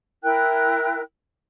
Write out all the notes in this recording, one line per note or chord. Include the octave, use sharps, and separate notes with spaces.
E4 A#4 G5 F#6